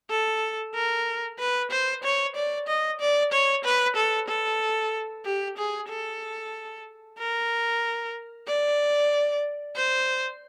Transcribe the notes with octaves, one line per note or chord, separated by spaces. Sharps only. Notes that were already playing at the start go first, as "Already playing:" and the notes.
A4
A#4
B4
C5
C#5
D5
D#5
D5
C#5
B4
A4
A4
G4
G#4
A4
A#4
D5
C5